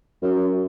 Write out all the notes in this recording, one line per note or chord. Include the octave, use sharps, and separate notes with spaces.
F#2